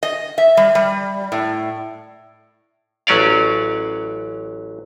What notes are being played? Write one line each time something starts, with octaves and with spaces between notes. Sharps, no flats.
D#5
E5
G3
G3
A2
A1 F#3 C#4 D5 F5